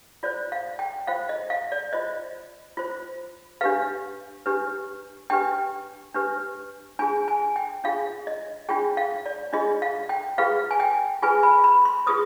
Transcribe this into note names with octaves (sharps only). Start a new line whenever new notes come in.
F4 C5 D5
F5
G5
F4 C5 F5
D#5
F5
D5
F4 C5 D#5
F4 C5
D4 G4 B4 F5
D4 G4 B4
D4 G4 B4 G5
D4 G4 B4
D4 F4 G#4 G#5
G#5
G5
D4 F4 G#4 F5
D#5
D4 F4 G#4 G5
F5
D5
D4 F4 G#4 D#5
F5
G5
F4 G#4 B4 F5
G#5
G5
F4 G#4 B4 G#5
B5
B5
C6
F4 G#4 B4 D#6